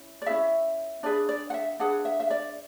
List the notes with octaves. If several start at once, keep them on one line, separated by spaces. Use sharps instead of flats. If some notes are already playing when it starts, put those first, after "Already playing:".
Already playing: C#4 E4
D5
C#4 E4 G#4 E5
D4 G#4 B4 D5
D5
F#5
E5
D4 G#4 B4 F#5
E5
E5
D5